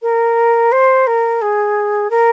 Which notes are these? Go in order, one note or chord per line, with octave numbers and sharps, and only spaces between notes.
A#4
C5
A#4
G#4
A#4